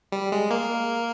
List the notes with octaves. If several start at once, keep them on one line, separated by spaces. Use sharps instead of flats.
G3
G#3
A#3